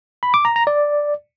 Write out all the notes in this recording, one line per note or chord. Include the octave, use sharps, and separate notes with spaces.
B5
D6
A#5
A#5
D5